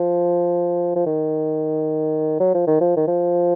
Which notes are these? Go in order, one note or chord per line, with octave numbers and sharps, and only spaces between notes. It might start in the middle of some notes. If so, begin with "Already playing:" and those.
Already playing: F3
F3
D#3
F#3
F3
D#3
F3
D#3
F3